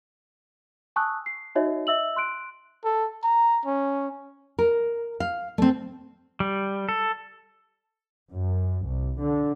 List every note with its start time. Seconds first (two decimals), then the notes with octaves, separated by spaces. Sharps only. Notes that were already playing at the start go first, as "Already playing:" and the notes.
0.96 G#5 A5 C#6 D#6 E6 F#6
1.26 C7
1.55 D#4 F#4 C#5 D#5 E5
1.87 D#5 E5 E6 F#7
2.16 C6 F#6 D7
2.84 A4
3.24 A#5
3.65 C#4
4.59 A#4
5.20 F5
5.58 A3 C4
6.40 G3
6.89 A4
8.31 F#2
8.86 C2
9.20 D3